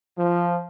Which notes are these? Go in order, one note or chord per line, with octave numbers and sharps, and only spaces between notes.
F3